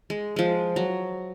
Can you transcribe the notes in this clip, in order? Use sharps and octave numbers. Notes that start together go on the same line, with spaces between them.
G#3
F3 G#3
F#3